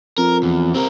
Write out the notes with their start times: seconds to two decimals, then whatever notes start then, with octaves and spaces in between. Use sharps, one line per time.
0.18 F2 A#4
0.43 E2
0.75 C3 C4 A#4